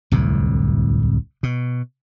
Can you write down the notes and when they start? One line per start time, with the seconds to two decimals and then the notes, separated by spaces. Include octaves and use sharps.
0.12 D1 C2 F2 A2
1.43 B2